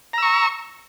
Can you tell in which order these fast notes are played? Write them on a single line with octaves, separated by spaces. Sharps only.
A#5 E6 C#6